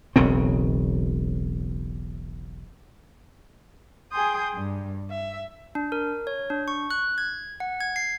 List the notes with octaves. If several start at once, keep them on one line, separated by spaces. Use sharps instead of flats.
E1 B1 C#3 C4
G#4 G5 G#5 C6 D#6 G6
G2
E5
D4
A#4
C#5
D4
C#6
F#6
G#6
F#5
G#6
C7